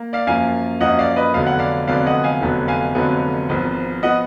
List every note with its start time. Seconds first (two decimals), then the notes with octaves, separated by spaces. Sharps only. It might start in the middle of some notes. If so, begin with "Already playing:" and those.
Already playing: A#3
0.13 D5 F5
0.27 F#2 F3 A#3 F5 G#5
0.80 F#2 F3 A#3 D#5 F#5
0.99 D5 F5
1.16 B4 D#5
1.34 F1 F2 D3 F#3 B3 F5
1.46 F#5
1.59 D5 F5
1.87 F1 F2 D3 F#3 B3 D5 F5
2.06 D#5 F#5
2.24 F5 G#5
2.42 F1 F2 D3 F#3 B3
2.68 F5 G#5
2.95 F1 F2 D3 F#3 B3
3.49 G#1 G#2 F3 B3
4.03 F3 B3 D#5 F#5